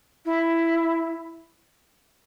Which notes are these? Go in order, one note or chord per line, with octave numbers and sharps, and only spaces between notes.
E4